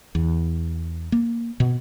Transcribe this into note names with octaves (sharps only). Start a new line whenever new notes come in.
E2
A#3
B2